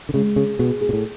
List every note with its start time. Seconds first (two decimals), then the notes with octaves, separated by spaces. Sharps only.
0.09 D3
0.14 C#3 G#3
0.36 C#3 G#4
0.59 B2 G#4
0.81 G#4
0.89 B2
0.93 A2